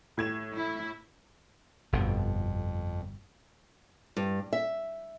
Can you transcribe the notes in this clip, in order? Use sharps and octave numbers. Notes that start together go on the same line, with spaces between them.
A2 G#6 E7
E4
G1 F2 B2 D3
G2
E5